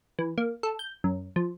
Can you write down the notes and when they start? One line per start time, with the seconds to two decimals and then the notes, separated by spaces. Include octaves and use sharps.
0.19 E3
0.38 A#3
0.63 A4
0.79 G6
1.04 F#2
1.36 F3